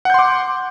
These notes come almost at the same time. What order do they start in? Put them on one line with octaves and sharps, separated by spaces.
F#5 G6 C6 D6